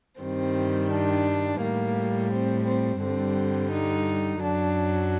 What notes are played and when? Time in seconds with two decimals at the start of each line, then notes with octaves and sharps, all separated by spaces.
0.22 G2 D#3 G3 C4
0.92 D4
1.62 A2 G3 A#3
2.33 C4
2.67 C4
3.02 G2 D3 G3 C4
3.73 D#4
4.43 F#2 F#3 D4